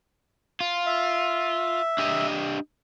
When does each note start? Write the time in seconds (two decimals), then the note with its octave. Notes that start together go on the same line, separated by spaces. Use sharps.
0.60 F4
0.86 E5
1.98 D4 G4 D#5